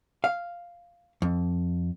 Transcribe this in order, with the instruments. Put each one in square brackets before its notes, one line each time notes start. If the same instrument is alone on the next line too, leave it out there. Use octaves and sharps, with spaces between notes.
[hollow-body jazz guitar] F5
F2